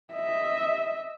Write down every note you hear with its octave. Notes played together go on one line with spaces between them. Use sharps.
D#5 E5